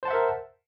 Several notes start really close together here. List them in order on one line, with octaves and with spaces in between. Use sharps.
C5 A5 F#5 E5 A#4